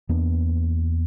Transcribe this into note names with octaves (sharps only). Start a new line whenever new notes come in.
E2 A#3 B3 D4